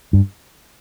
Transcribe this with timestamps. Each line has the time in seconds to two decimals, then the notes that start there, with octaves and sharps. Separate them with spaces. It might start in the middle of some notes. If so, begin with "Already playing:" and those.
0.13 G2